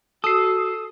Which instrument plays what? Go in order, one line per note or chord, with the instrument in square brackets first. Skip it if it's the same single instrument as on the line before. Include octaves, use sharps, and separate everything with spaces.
[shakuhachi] F#4 [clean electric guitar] A4 [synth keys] D#6 C7